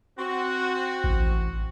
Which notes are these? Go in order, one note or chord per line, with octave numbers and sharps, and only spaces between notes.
C4 F#4
A1